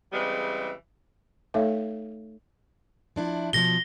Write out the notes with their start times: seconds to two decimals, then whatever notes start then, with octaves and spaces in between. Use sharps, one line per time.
0.12 C#3 E3 G3 G#3 C4
1.54 A3 D#4 A4 C#5 E5 F5
3.16 F3 D4 E4
3.53 B2 D3 F3 A#6 G7